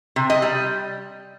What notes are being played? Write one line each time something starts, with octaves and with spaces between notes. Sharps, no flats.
C3
D#5
G3